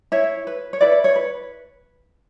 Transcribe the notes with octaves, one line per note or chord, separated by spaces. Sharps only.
E4 C#5 E5
B4
C#5
E4 B4 D5
C#5
B4